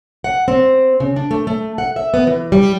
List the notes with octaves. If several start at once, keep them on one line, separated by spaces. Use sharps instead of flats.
F#5
C4
C#3
D4
A3
A3
F#5
E5
B3
E3
G3